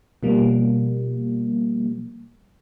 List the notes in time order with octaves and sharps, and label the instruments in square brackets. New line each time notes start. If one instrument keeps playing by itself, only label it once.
[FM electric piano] B2 F3 G3 A#3